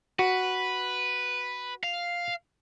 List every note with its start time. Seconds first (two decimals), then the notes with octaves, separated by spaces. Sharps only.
0.19 F#4 B4
1.83 F5